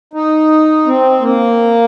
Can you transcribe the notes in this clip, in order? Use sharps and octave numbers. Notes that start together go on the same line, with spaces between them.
D#4
C4
A#3